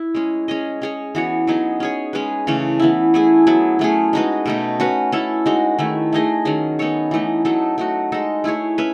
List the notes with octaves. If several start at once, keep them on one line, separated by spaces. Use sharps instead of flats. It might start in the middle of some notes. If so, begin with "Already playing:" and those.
Already playing: E4
G#3 C#4 G#4
C#4 G#4 D#5
C#4 G#4 C#5
E3 B3 F#4 C#5
F#3 B3 D#4 G#4
C#4 G#4 C#5
G#3 C#4 G#4 B4
C#3 E3 A3 C#4
E3 B3 E4
A3 E4 G#4
F#3 B3 E4
F#3 A3 C#4 G#4
G#3 D#4 F#4 B4
B2 A3 D#4
C#4 F#4 B4
C#4 E4 A4
G#3 D#4 F#4
D#3 A3 E4
A3 D#4 G#4 D#5
D#3 F#3 C#4 G#4
B3 D#4 A4 C#5
E3 A3 D#4
F#3 A3 D#4 A4
A3 D#4 F#4
G#3 D#4 A4
A3 E4 G#4 C#5
C#4 B4 E5